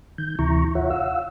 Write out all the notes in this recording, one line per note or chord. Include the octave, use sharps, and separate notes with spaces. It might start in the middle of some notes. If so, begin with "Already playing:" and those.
D#3 G6
D2 C3 E3 E4 A#5 C#6
D#2 F4 C#5 E5 F#5
F5 F#5 E6